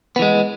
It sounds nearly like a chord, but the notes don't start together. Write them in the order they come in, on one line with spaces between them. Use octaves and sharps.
B3 E3 G#3